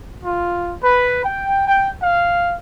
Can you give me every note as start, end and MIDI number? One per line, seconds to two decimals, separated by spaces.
0.24 0.72 65
0.82 1.23 71
1.24 1.65 79
1.67 1.90 79
2.03 2.55 77